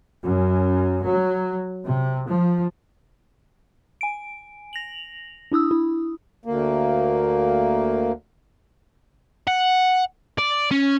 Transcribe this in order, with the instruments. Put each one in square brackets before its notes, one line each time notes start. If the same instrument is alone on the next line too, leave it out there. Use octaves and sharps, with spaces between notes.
[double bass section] F#2
F#3
C3
F3
[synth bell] G#5 D7
A#6 F7 F#7
D4 E4 D#6 E6
E4
[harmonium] D2 A#3
[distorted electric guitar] F#5
D5
C#4